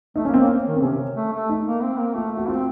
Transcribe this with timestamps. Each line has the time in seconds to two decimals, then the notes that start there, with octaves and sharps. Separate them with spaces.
0.16 A3 D#4
0.25 A#3 C#4
0.34 C4
0.39 A#3 C#4
0.66 D#3
0.76 C4
0.82 C3 C#4
1.15 A3
1.33 A3
1.49 D#4
1.66 A#3
1.82 C4
1.99 A#3
2.15 A3 F4
2.32 A3
2.37 F#4
2.48 C4 F4